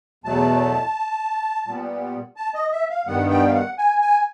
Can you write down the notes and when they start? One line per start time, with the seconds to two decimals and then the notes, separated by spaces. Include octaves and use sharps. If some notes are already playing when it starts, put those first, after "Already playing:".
0.24 E2 B2 F#3 A3 A5
1.66 A#2 G3 B3
2.37 A5
2.54 D#5
2.72 E5
2.90 F5
3.07 G2 D#3 G3 B3 F#5
3.30 G5
3.46 F5
3.54 F#5
3.78 G#5
4.01 G#5